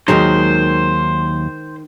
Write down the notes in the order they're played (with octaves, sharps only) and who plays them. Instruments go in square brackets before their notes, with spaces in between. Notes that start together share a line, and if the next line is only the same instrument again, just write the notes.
[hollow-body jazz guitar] D#2 F#3 [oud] D#3 G#3 D#4 [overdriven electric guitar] C5